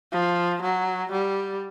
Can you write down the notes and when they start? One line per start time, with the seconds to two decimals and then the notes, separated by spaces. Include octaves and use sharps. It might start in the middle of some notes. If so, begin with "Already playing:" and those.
0.12 F3
0.62 F#3
1.12 G3